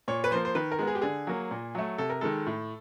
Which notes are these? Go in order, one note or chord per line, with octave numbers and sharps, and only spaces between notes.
A#2 C#5
B4
F3 A#3 C5
C5
D#3 B4
A#4
G#3 B3
G#4
G4
D3 G#4
F#3 A#3
A#2
F#3 A3
C3 A4
A#4
D#3 G#3 A4
A2